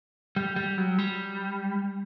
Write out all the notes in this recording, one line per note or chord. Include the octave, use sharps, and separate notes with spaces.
G3
G3
F#3
G3